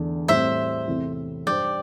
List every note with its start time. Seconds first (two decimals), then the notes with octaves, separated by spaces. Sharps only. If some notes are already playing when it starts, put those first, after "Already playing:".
Already playing: E2 D3 A3 D4
0.28 A2 G3 C4 C5 E5
0.87 E2 C3 A3 C4 E4
1.47 G2 G3 D4 C5 D5 G5